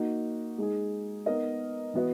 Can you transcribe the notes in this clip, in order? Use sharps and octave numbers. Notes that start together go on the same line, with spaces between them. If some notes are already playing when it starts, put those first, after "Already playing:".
Already playing: A#3 D#4 F#4
G#3 D#4 G#4
B3 D#4 A#4 D#5
E3 B3 F#4 B4 D#5